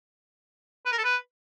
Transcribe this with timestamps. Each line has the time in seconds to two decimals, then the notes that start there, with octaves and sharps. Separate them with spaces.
0.86 B4
0.92 A#4
0.98 A4
1.04 B4